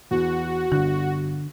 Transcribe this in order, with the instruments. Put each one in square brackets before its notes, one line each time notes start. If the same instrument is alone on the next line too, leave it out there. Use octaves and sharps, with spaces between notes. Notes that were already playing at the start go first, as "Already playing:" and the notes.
[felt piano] E2 [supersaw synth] F#4
[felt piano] G1 F#6 [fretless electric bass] D3